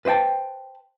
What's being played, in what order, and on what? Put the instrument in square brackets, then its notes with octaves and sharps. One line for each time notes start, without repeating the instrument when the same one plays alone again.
[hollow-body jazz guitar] B4 C5 D#5 G5 A5